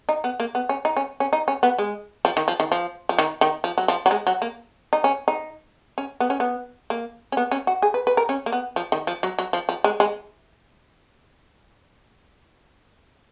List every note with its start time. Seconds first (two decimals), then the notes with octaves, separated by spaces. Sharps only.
0.09 D#4
0.24 B3
0.40 A#3
0.55 B3
0.69 C#4
0.85 D#4
0.97 C#4
1.20 C#4
1.33 D#4
1.48 C#4
1.63 B3
1.78 G#3
2.25 F3
2.37 D#3
2.48 F3
2.60 D#3
2.72 F3
3.09 F3
3.19 D#3
3.41 D#3
3.64 F3
3.78 F#3
3.88 F3
4.06 F#3
4.11 G#3
4.27 F#3
4.42 A#3
4.93 D#4
5.04 C#4
5.28 D#4
5.98 C#4
6.20 B3
6.30 C#4
6.40 B3
6.90 A#3
7.32 C#4
7.37 B3
7.51 C#4
7.67 F#4
7.82 G#4
7.94 B4
8.07 B4
8.17 A#4
8.29 C#4
8.46 A#3
8.52 B3
8.76 F3
8.92 D#3
9.07 F3
9.23 F#3
9.39 F#3
9.53 F3
9.69 F3
9.84 G#3
10.00 G#3